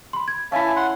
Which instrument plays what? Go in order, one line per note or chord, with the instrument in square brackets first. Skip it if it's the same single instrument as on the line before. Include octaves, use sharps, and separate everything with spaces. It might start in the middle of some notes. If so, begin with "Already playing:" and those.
[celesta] B5 C6
G#6
[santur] C#4 E4 [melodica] E5 G#5 A5 [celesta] F5 B6
[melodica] F#5 C6